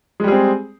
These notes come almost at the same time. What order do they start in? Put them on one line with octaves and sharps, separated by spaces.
G#3 G3 G#4 C4